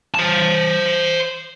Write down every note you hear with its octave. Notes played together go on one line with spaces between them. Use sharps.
C5 A5